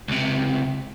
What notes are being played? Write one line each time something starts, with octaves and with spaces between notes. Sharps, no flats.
C#2 C3